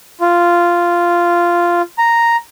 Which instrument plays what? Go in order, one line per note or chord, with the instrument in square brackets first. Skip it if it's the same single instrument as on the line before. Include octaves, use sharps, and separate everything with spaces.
[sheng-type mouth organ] F4
A#5